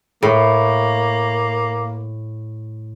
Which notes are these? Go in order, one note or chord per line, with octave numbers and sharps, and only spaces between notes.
A2 A#3